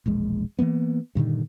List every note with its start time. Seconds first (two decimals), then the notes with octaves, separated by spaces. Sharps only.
0.06 E1 A#1 G#3
0.59 E3 F3 A#3 B3
1.15 G2 A#2 D3 D#3